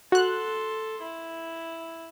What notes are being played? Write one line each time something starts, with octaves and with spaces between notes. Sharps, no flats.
F#4 A4 C6 F#6
E4